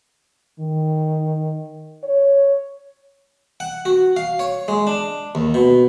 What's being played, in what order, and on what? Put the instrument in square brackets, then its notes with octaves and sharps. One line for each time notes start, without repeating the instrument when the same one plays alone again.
[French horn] D#3
C#5
[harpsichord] F#5
F#4
F5
C#5
G#3
D4
D#2
B2